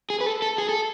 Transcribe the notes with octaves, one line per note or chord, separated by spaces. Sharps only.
G#4
B4
A4
A4
G#4
A4